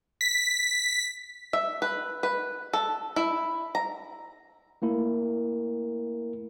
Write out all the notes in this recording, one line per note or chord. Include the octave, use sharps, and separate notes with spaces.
B6
E5
B4
B4
A4
E4
A#5
A3 A#3 E4 A#4